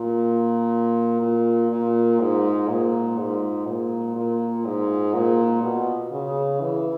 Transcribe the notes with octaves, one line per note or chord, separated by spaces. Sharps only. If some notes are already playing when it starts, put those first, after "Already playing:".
Already playing: A#2
A#2
A#2
G#2
A#2
G#2
A#2
A#2
G#2
A#2
B2
C#3
E3